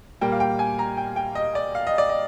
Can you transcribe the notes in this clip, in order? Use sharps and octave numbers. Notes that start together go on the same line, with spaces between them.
A#2 G3 A#3 G5
F5
G5
G#5
A#5
G5
G5
D#5
D5
F5
D#5
D5
D#5